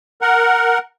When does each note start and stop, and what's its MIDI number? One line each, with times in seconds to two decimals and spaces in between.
0.21 0.78 70
0.21 0.78 78